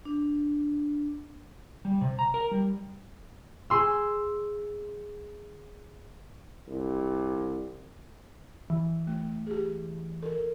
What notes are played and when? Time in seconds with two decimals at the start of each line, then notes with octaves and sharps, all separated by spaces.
0.05 D4
1.85 G3
2.01 C3
2.19 A#5
2.34 A#4
2.51 G3
3.70 G#4 C6 E6
6.68 C2
8.70 E3
9.07 A3
9.47 G4 G#4
10.23 A4 A#4